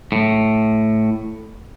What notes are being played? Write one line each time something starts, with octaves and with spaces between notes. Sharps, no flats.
A2